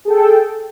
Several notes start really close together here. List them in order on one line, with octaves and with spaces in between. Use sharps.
G#4 A4 G5